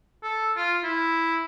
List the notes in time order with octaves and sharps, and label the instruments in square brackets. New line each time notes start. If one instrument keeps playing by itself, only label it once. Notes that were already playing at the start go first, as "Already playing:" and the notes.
[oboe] A4
F4
E4